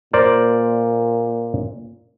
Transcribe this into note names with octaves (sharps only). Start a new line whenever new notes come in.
A#2 A#4 C5 D5